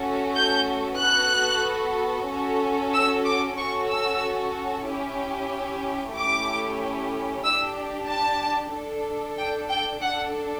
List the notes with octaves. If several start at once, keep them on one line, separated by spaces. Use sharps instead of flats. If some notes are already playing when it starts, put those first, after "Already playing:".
Already playing: A3 C#4 F#4 A4
G6
B3 F#4 A4 F#6
C#4 F#4 A4
E6
D6
C#4 F#4 A4 C#6
E6
C#4 E4 G4
A3 C#4 E4 G4 D6
D4 G4 E6
A5
D4 A4
G5
G5
D4 A4 F#5